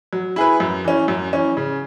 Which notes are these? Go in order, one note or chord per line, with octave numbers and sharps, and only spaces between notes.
F#3
E4 G#4 B4
F#2
E3 C#4
F#2
E3 C#4
C#3